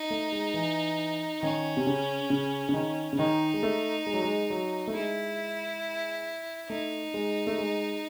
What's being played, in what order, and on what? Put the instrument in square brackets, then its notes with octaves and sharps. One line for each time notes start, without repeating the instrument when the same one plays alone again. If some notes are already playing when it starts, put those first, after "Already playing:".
Already playing: [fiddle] D#4
[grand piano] A3
G#3
E3
[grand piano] D#3 [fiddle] C#4
[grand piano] C3
C#3
C#3
C#3
D#3
C#3
[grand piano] D#3 [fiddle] D#4
[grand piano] G#3
A3
G#3
F#3
G#3
F#3
A3
[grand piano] G#3 [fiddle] E4
[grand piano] A3 [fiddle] D#4
[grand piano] G#3
A3
G#3